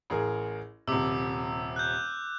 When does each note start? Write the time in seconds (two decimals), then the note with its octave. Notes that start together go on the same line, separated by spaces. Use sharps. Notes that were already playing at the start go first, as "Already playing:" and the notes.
0.10 A1 G#4 A#4
0.87 D#1 C3 D6 E6
1.76 F#6 G6